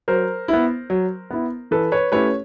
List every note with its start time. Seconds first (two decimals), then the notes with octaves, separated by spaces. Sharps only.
0.08 F#3 A#4 C5
0.48 B3 E4
0.90 F#3
1.31 B3 E4
1.71 E3 A4 B4
1.92 B4 C#5
2.12 A3 C#4 E4 G4 B4 C#5